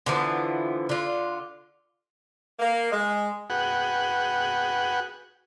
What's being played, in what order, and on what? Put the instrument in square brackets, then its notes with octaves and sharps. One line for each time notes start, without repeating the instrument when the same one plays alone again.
[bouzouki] D3 E3 F3 B3
D3 F4
[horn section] A#3
G#3
[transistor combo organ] F#4 G#4 B4 F#5 G5